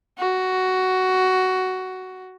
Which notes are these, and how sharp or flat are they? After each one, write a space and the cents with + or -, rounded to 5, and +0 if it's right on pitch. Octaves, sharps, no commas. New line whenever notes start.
F#4 +10